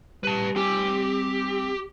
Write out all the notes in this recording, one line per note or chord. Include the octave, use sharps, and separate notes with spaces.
G3 B4 A5
C4 G4 G#5